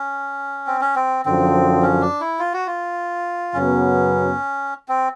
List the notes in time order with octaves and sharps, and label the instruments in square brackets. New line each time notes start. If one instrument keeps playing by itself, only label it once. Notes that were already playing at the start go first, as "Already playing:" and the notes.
Already playing: [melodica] C#4
C4
C#4
C4
[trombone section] F#2 D3 F3 [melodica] C4
[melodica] C#4
D4
E4
F4
F#4
F4
[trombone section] F#2 C#3 F#3 B3 [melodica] C#4
[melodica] C4